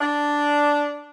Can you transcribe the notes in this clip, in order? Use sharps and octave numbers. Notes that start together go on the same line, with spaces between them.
D4